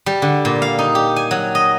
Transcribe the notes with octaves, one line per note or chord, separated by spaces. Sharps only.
G3
D3
A#2
F5
D#4
G4
G#5
F#3
D#5